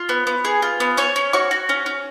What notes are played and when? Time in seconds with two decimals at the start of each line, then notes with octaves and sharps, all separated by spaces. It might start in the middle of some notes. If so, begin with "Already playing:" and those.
Already playing: F4
0.09 B3
0.27 B3
0.45 G#4
0.62 F4
0.80 B3
0.97 C#4 C#5 C#6
1.16 C#4
1.33 F#4 C#5 C#6
1.51 F#4
1.69 C#4
1.86 C#4